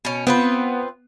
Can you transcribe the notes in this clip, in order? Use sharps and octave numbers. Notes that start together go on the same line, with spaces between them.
B2 C#4
B3 C4 F4 B4